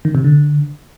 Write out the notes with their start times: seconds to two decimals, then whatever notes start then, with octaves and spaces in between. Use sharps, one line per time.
0.05 D#3
0.15 C3
0.24 D3